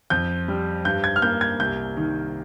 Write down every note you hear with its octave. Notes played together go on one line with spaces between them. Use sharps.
F2 G6
G3
G2 G6
G#6
F6
A#3 G6
G#6
C2 G6
D#3